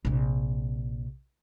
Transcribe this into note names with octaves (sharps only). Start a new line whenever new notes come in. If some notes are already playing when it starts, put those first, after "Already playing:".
A#1 C3